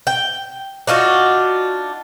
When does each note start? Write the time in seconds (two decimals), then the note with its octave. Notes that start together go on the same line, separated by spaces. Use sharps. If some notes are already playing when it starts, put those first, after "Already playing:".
0.07 G5
0.87 D4 D#4 F4 F#4